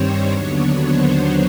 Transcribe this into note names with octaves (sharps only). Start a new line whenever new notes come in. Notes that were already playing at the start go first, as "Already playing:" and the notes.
Already playing: G2 D#3 G3 C4 C5 C#5
D#2 D3 F#3 B3 D4 C#5
C5